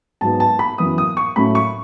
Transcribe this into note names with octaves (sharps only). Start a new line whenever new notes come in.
G#2 F#3 B3 A5
A5
B5
F#2 E3 B3 D#6
D#6
C#6
A2 F#3 A3 C#4 B5
C#6